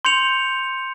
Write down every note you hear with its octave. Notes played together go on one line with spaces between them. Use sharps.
C6 G6 C#7 F7